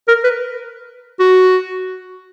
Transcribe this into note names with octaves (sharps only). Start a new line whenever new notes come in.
A#4
B4
F#4